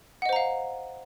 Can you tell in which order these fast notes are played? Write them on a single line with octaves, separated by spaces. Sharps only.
F#5 D#5 C5 A#5 F5